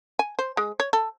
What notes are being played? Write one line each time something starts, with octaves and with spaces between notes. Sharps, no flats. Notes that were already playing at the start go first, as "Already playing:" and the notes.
G#5
C5
G#3
C#5
A4